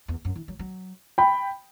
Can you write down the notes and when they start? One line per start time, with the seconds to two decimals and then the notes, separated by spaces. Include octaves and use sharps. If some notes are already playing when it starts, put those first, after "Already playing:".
0.08 E2
0.25 F#2
0.35 E3
0.48 F#3
0.59 F#3
1.18 G5 B5